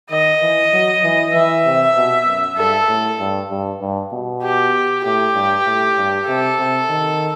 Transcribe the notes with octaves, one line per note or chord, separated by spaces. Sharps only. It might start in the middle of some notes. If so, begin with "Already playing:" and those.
D#3 D#5
E3
F#3
E3
E3 E5
C3
B2
F#2
G2 A4
A2
G2
G2
G2
B2
G4
A2 G4
G2
A2
G2
C3 A4
C3
D#3